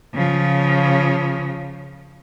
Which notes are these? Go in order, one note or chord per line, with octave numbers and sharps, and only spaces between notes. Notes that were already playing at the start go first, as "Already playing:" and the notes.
C#3 F3